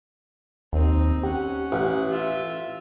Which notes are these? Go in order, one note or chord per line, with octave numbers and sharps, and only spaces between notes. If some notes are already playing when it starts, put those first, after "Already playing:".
D#2 C4 D#4
C#4 G4 F#5
A1
F4 E5